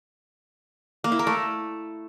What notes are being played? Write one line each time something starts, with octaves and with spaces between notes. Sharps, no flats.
A#3
E4
A#4
A3